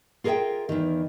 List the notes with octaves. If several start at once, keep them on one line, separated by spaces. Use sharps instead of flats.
F4 G#4 A#4 C#5 E5 G5
E2 D#3